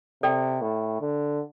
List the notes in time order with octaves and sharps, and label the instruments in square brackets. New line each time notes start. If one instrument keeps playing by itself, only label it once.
[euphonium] C3 [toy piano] A4 D5 G5
[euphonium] A2
D3